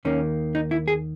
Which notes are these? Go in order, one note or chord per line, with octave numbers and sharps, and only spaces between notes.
D#2 D#3 A#3 C#4
D#4
E4
G#4